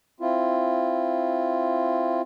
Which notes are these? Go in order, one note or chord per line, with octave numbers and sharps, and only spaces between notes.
C4 E4 F4